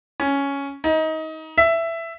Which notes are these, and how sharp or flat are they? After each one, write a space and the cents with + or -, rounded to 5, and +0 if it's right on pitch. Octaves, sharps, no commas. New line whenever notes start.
C#4 +5
D#4 +25
E5 +10